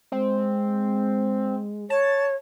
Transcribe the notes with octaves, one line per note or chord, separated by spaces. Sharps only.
G#3 C4
C#5 A5